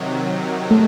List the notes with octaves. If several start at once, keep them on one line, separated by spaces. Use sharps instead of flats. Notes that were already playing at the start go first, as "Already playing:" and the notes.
Already playing: C3 D#3 F#3
A3